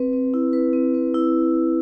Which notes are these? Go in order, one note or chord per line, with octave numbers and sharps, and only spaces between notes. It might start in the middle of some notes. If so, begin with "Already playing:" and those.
Already playing: C4 B4
C4
E4
B4
C4
C4
E4